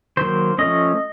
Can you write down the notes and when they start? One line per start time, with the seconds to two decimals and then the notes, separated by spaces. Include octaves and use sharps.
0.17 D#3 F#3 A#3 C5
0.58 F3 A3 C#4 D#5